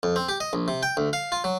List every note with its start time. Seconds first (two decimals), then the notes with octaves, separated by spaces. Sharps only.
0.03 F2
0.16 C4
0.29 G4
0.40 D#5
0.53 A#1
0.68 C3
0.83 G5
0.97 D2
1.13 F5
1.32 F4
1.44 F#3